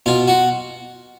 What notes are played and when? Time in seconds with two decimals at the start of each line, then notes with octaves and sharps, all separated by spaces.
0.06 B2 F4
0.28 F#4